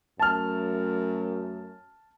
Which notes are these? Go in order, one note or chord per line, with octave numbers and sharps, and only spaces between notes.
F#2 A3 A5 F6